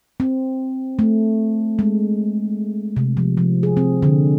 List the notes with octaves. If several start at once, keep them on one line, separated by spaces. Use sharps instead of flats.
C4
A3
G#3
C3
F3
F3
G#4
C4
D3